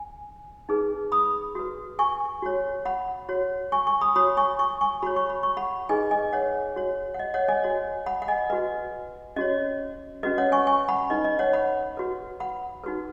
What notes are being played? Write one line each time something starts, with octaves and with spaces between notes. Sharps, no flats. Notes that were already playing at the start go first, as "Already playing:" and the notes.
Already playing: G#5
D#4 G#4 B4
B5 D#6
F#4 B4
G#5 C#6
F#4 C#5
F#5 B5
F#4 C#5
G#5 C#6
G#5 C#6
B5 D#6
F#4 C#5 B5 D#6
G#5 C#6
G#5 C#6
G#5 C#6
F#4 C#5 B5
C#6
B5
C#6
F#5 B5
D#4 G#4 B4 D#5 G#5
D#5 G#5
C#5 F#5
F#4 C#5
F#5
D#5
C#5 F#5
D#5 G#5
F#4 C#5
F#5 B5
F#5
D#5 G#5
F#4 B4 D#5
C#4 F#4 C#5 D#5
C#4 F#4 B4 D#5
C#5 F#5
G#5 C#6
G#5 C#6
F#5 B5
D#4 B4 D#5
D#5
C#5 F#5
F#5 B5
F#4 B4
F#5 B5
D#4 F#4 B4